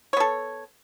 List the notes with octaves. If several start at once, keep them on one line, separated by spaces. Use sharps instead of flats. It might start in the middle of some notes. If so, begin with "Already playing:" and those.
B3 A4 C#5